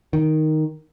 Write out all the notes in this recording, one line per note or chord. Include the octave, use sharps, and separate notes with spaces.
D#3